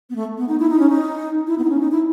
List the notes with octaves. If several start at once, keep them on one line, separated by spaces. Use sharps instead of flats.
B3
A3
B3
D#4
E4
D#4
C#4
D#4
E4
B3
D#4
C#4
D#4
E4